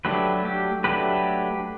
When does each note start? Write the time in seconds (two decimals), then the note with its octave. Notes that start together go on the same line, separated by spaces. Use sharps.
0.05 F#3 A3 D4 G4 B4
0.45 G4
0.84 F#3 A3 D4 G4 B4